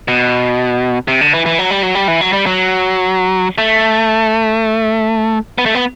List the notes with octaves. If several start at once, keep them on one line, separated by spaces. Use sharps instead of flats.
B2
C3
D3
E3
E3
F#3
G3
F#3
G3
E3
F#3
G3
F#3
A3
B3
A3
B3